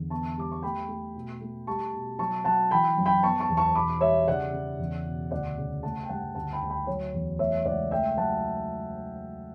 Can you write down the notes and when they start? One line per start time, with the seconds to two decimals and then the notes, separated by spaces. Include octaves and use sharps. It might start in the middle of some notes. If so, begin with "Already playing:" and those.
Already playing: E2 D3
0.10 B3 A5 C#6
0.38 G3 D6
0.52 C#6
0.62 A3 G5 B5
0.88 A3
1.14 B2
1.41 A3
1.67 G3 A5 C#6
1.93 B2
2.19 F#3 A5 C#6
2.44 F#3 F#5 A5
2.71 E3 G5 B5
2.97 F#2
3.06 G5 B5
3.23 B3 A5 C#6
3.40 A5 C#6
3.49 E2
3.57 A5 C#6
3.75 B2 B5 D6
4.01 G3 C#5 E5
4.28 C#3 D5 F#5
4.53 C#3
4.79 E2
5.05 B2
5.31 D2 D5 F#5
5.57 C#3
5.83 A3 F#5 A5
6.03 G5
6.09 G2 F#5 A5
6.35 D2 F#5 A5
6.52 G5 B5
6.62 D2
6.70 G5 B5
6.87 F#3 C#5
7.13 E2
7.39 A3 C#5 E5
7.65 C#2 D5 F#5
7.91 A3 E5 G5
8.17 F#3 F#5 A5